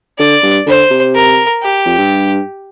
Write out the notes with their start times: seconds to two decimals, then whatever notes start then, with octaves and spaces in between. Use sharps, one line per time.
0.19 D3 D5
0.43 G2
0.67 D3 C5
0.91 C3
1.14 A#4
1.62 G4
1.86 F2
1.98 G2